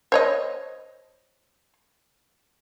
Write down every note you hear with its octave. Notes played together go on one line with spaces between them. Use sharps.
C5 C#5 D#5